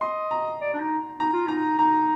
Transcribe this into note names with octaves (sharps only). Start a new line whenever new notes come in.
D#5 C6
A#5
D5
D4
D#4
D#4 A#5
F4
D#4 A#5
D#4 A#5